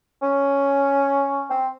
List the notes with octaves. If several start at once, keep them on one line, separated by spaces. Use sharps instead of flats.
C#4
C4